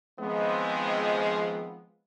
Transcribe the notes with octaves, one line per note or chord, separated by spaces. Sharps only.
D#3 F3 G#3 B3 C4